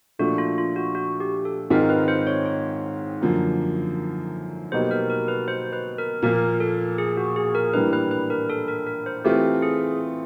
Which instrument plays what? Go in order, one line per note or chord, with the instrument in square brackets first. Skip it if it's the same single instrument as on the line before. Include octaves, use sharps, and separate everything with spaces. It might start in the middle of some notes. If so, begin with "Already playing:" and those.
[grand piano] A#2 F3 A3 D4 [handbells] F#4
[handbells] F4
F4
F#4
F#4
G4
A4
[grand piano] G#2 D#3 G#3 C4 F4 [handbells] A#4
[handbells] B4
C5
C#5
C#5
[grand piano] F#2 D3 F3 A#3
[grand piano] B2 F#3 A#3 D#4 G4 [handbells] C5
[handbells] A#4
A#4
B4
C5
B4
A#4
[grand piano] A#2 F3 A#3 [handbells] A#4
[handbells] A4
G#4
F#4
G#4
A#4
[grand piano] A2 E3 G3 A#3 D4 [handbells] B4
[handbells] B4
B4
A#4
A4
A#4
A#4
C5
[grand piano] E3 A3 C4 F4 [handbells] G4
[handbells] G#4